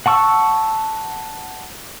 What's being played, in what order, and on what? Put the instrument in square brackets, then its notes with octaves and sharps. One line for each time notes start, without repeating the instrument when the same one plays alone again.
[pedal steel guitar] F#5 A5 C#6 E6